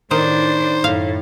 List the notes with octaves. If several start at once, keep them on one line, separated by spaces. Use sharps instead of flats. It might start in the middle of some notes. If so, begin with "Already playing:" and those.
A2 D#3 D4 D#4 C5
F#2 A2 F5